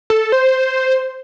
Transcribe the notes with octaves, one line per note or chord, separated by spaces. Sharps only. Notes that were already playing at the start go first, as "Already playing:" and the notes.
A4
C5